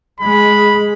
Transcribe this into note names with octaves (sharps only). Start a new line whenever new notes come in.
G#3 B5